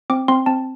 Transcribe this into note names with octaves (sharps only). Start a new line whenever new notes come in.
C4 D6
C4 C6
C4 A5